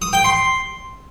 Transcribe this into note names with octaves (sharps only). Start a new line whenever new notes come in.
D#6
G5
C6